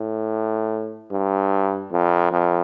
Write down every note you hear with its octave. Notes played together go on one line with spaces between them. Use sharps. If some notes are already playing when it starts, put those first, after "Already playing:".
Already playing: A2
G2
F2
F2